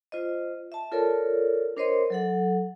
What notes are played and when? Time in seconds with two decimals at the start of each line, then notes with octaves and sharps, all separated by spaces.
0.12 F4 C5 D#5
0.72 E5 A5
0.92 F4 A4 A#4 C#5 D5
1.77 D4 A#4 C5 C#5 D#5 C6
2.10 F#3 A4 F#5